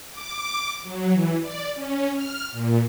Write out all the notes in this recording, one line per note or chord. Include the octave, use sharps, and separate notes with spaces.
D6
F#3
E3
D5
C#4
F6
A#2